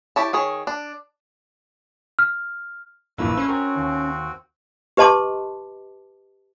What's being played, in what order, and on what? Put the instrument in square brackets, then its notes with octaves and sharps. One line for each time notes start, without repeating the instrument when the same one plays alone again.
[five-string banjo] E4 G4 C#5 A5
D#3 G#4 C#5
D4
[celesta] F6
[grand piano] A#1 E3 A#3 [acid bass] G2 [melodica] A3 B4 E6
[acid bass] C#4 [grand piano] C5
[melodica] C4 F#4 [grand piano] A#4
[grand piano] D#2
[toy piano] G4 B4 D#5 A5 C6 D6